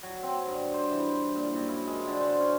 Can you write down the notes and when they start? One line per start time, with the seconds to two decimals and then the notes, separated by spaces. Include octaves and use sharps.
0.03 F#3
0.23 C4
0.46 G2
0.74 C5
0.91 E3
1.35 A#2
1.55 F#2
1.68 E4
1.87 G#3
2.08 D3
2.20 C5
2.40 C#4